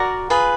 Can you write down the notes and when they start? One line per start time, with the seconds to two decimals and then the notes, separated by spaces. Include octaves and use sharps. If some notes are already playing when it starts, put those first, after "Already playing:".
Already playing: F#4 A#4 D5 A#5
0.30 F4 G#4 B4